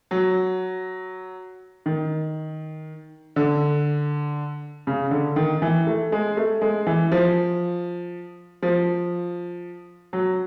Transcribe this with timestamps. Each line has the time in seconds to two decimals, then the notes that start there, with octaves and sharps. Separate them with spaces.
0.11 F#3
1.86 D#3
3.36 D3
4.87 C#3
5.11 D3
5.36 D#3
5.62 E3
5.87 A3
6.12 G#3
6.37 A3
6.61 G#3
6.87 E3
7.12 F3
8.62 F3
10.13 F#3